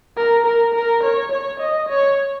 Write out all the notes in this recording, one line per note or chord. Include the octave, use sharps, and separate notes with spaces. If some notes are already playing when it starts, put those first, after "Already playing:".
A#4
A#4
A#4
C#5
C#5
D#5
C#5